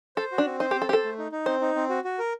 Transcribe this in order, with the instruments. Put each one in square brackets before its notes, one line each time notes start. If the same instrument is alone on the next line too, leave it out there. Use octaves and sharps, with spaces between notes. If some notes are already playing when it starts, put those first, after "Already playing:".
[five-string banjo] A4 [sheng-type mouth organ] C5
[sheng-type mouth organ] F#4
[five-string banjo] D4
[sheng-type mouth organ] C4
[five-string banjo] D#4 [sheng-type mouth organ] C5
[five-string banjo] G4
[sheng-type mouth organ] C4
[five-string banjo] A4
[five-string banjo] G4 [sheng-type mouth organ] C5
[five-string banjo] A4
[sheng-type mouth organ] A3
D#4
D#4
[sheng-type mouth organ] C4 [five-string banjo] C5
[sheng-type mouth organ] D#4
C4
F#4
F#4
A#4